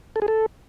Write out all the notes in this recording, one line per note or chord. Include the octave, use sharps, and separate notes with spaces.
A4
G#4
A4